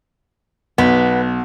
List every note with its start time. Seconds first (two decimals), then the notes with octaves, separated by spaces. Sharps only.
0.78 B1 B3